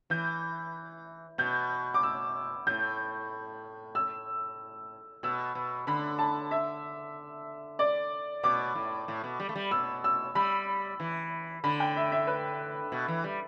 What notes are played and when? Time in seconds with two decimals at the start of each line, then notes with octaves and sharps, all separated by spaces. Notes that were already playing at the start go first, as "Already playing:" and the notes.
0.10 E3 G6
1.38 B2 G6
1.94 D6
2.03 E6
2.67 A2 G6
3.95 E6
5.23 B2 E6
5.55 B2
5.87 D3 B5
6.19 A5
6.51 E5
7.79 D5
8.43 B2 D6
8.75 A2
9.08 A2
9.24 B2
9.40 G3
9.49 A3
9.56 G3
9.71 B2 E6
10.04 E6
10.35 G3 B5
11.00 E3
11.64 D3 B5
11.80 G5
11.97 E5
12.12 E5
12.27 B4
12.92 B2
13.08 E3
13.24 G3